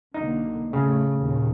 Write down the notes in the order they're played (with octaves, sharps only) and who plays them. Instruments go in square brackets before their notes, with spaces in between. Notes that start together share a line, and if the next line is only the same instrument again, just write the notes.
[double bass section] B1 D3 A#3 [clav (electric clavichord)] D#4
[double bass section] A2 A3 [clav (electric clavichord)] C#3
[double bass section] D#2 A#2 D#3